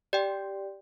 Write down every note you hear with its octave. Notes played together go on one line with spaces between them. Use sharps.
G4 D5 G5